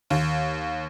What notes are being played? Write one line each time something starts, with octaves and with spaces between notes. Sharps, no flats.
D#2